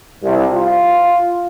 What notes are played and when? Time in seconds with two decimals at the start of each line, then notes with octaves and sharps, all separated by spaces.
0.23 C2
0.52 F4